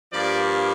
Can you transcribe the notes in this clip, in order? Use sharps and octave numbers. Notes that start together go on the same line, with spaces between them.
G2 F3 A#3 D5